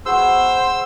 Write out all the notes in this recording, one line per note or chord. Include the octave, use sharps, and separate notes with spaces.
B3 F#4 G#4 C5 E6